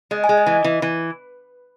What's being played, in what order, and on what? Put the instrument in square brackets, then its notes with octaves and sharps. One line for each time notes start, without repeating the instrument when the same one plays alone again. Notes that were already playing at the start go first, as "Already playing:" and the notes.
[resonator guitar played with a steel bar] G#3 [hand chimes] D#5
[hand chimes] G#5
[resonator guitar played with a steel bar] G#3
[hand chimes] D#5
[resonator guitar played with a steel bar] E3
E3
E3